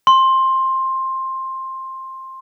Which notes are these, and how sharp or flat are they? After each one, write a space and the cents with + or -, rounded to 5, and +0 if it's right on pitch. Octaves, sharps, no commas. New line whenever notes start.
C6 +15